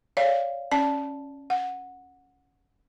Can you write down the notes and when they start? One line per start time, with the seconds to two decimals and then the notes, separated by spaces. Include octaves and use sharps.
0.17 C#5 D5 F5
0.72 C#4 D5 A5
1.50 F#5